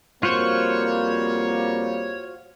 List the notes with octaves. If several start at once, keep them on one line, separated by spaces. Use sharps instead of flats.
F2 G3 A#3 F4 F#4 C5 C#5